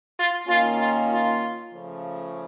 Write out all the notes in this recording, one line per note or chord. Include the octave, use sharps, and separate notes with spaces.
F4
D#3 A#3 C#4 F4
F4
F4
C#3 F3 A3